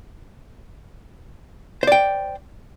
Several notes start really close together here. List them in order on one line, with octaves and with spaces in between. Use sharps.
C5 D5 G5